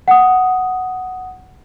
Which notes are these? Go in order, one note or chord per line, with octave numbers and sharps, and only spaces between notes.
F#5 D#6